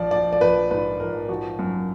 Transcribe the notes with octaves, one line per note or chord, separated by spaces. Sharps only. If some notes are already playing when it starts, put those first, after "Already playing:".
Already playing: A#1 F3 D5
F3 D5
D5
A#1 B4
G#2 B4
A#1 A#4
F3 F#4
F#2